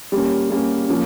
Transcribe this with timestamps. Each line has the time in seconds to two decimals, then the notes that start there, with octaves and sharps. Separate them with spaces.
0.12 G3 A#3 C#4
0.50 G3 A#3 C#4
0.88 F3 A#3 C#4